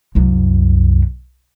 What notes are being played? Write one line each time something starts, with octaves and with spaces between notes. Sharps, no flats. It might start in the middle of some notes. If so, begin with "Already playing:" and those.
C2 F#2